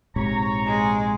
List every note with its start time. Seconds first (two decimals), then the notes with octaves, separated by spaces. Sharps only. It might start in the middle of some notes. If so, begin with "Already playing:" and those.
0.16 A#1 G#2 C3 C#5 A#5
0.66 G#3